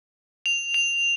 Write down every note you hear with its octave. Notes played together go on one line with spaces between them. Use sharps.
F7
F7